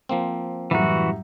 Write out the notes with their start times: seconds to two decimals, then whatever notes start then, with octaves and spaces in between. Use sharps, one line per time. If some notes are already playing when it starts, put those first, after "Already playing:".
0.09 F3 A#3 C4
0.71 F#2 A2 E3 G3 F#4 E5 F#5 A#5